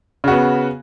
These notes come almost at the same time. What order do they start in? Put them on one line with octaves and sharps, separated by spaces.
C#3 F#4 B3